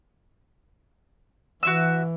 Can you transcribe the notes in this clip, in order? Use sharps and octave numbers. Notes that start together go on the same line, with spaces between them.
E3 F#4 E5 E6